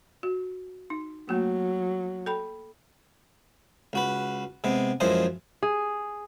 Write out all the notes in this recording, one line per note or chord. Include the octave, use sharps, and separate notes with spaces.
F#4
D#4
F#3 A3 A#3 F#4
A4 G5 B5
C#2 F#4 B4
C3 G#3 B3
F#2 E3 F3 G#3 C5 D#5
G#4